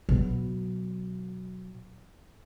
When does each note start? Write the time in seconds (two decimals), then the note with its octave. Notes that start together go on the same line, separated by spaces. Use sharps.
0.09 B2 F#3